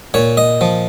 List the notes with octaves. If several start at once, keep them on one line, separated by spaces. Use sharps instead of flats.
A#2 C#5
D#5
F3